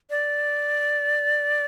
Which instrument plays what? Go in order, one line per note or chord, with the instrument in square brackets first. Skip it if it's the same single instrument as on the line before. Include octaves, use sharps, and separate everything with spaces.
[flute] D5